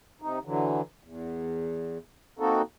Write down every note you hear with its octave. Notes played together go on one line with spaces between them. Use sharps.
C3 D#4
D3 E3 F#3
E2
A#3 C4 D#4 F#4 A4